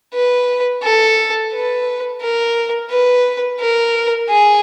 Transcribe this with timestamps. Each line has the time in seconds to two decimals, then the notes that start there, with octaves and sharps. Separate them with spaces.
0.13 B4
0.82 A4
1.52 B4
2.21 A#4
2.90 B4
3.60 A#4
4.29 G#4